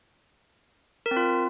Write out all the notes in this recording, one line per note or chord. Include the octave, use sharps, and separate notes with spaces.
A#4
C4
F4